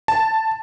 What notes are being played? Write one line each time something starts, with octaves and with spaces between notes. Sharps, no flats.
A5